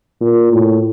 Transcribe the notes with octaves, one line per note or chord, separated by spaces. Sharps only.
A#2
A2